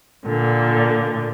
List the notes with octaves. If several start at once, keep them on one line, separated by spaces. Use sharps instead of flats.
A#2 D3